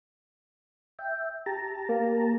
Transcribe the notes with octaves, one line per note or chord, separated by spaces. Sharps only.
E5 G5
G4 A5 A#5
A#3